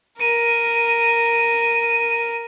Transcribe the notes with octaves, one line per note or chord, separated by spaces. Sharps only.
A#4 D#7